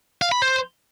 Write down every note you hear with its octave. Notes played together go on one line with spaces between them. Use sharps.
F5
B5
C5